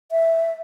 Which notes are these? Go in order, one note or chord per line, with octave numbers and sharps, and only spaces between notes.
E5